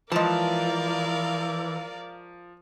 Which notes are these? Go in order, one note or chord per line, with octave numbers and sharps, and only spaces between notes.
E3 F3 G#3 A#4 D5 F5 A5